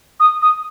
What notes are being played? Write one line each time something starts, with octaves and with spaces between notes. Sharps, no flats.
D#6
D#6